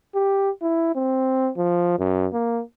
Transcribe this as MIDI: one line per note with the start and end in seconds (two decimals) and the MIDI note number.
0.15 0.50 67
0.62 0.92 64
0.96 1.51 60
1.58 1.99 53
1.99 2.27 42
2.33 2.62 58